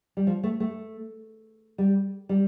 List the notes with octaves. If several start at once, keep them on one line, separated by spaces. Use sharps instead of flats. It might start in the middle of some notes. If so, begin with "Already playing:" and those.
G3
F3
A3
A3
G3
G3